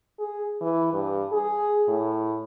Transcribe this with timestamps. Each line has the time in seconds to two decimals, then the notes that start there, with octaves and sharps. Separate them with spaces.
0.19 G#4
0.61 E3
0.93 G2
1.32 G#4
1.88 A2